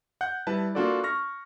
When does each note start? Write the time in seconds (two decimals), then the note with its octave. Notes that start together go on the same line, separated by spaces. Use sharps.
0.21 F#5 F#6 G6
0.47 G3 E4 B4 A5
0.75 A#3 D4 F4 F#4 A4 D5
1.04 C#6 F6 A#6